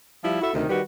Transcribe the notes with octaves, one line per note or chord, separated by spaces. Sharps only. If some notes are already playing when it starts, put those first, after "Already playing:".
F3 G3 E4
E4 F#4 A4 E5
D2 C3 D#3
D#3 G3 F#4 B4